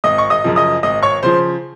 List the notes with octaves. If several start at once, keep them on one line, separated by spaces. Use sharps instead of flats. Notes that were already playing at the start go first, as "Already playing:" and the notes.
G#1 D#5 D#6
C#6
D#5 D#6
F#2 C#3 F3
D#5 D#6
G#1 D#5 D#6
C#5 C#6
C#3 F3 C5 C6